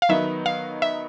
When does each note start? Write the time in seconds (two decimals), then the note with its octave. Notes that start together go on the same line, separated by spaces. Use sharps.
0.02 F5
0.09 D#3 F#3 B3 D#4 E5
0.46 F5
0.82 E5